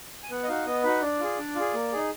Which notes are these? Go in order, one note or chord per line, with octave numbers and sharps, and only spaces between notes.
G#5
B3 F#5
D#5
D#4 F#4 F5
B3 D#5
D#4 F#4 B4
D4 D5
F4 G#4
D4
F4 G#4
A#3
D#4 G#4